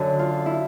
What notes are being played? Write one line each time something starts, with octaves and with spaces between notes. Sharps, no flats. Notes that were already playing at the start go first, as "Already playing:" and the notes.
Already playing: F#2 D3
F4
E4